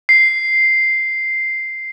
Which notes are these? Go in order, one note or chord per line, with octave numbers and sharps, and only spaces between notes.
C7